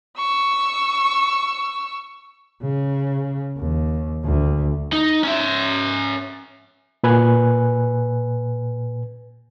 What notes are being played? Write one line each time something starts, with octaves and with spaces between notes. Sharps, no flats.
C#6 E6
C#3
D#2
D2
D#4
C#4 E5
A#2 B4 G#5 F#6